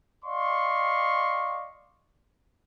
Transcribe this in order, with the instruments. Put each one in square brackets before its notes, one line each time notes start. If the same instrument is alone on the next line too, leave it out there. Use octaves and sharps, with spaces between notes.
[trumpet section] D5 D#5 F5 C6 C#6